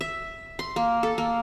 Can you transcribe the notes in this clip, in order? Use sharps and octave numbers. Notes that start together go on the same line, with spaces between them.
E5
C6
A#3
A4
A#3